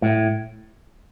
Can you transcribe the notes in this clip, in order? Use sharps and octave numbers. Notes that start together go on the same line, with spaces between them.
A2